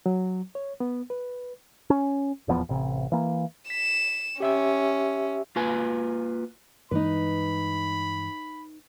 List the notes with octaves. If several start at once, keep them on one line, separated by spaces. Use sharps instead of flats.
F#3
C#5
B3
B4
C#4
D#1 E2 F3 B3
A1 C3
E3 A#3
B6 E7
C#4 G4 E5 E6
A#3 F4 B4 G#5
G2 E3 G#3 D#4 B4 B5